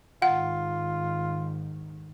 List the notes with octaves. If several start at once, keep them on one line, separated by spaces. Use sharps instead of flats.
G#2 D#3 F4 F#5